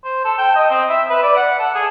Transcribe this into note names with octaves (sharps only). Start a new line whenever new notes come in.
C5
A4
G5
D#5
C4
E5
B4
D5
F#5
A4
G#4